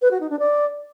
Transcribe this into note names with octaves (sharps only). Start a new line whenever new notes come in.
B4
F#4
D#4
D4
D5